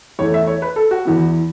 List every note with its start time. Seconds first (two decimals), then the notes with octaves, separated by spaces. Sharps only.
0.19 E2 E3 A3 C#5
0.34 E5
0.47 C#5
0.62 B4
0.76 A4
0.91 F#4
1.05 E2 E3 B3